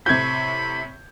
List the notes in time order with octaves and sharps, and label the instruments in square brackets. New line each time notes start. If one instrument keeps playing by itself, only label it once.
[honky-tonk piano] A2 C3 [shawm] B5 [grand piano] G6 G#6